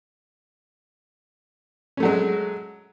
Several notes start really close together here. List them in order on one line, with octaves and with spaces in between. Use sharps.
C#4 A3 F#3 G#3